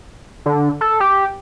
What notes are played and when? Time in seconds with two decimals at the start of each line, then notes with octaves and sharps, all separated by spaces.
0.46 D3
0.81 A4
1.00 G4